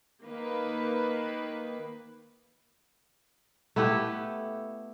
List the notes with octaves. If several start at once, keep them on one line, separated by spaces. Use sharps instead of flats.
D#3 A#3 B4
A3 B3 E4 G4